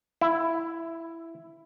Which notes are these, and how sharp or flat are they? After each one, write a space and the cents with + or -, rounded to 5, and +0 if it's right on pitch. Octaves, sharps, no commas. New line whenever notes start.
E4 +5